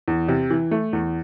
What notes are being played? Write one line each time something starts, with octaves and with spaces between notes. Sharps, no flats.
E2
C3
E3
A3
E2